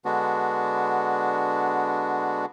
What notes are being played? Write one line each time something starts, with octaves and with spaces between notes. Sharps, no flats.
D3 G#3 B3 D4 F#4